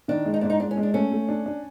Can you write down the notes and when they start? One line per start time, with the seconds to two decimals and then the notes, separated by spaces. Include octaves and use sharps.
0.08 D#3 D4
0.25 G#3
0.34 D#4
0.41 G#2 D4
0.50 D#4
0.60 G#3 D4
0.71 C#4
0.77 G#3
0.83 D4
0.94 A3 C#4
1.12 A3
1.29 D4
1.46 D4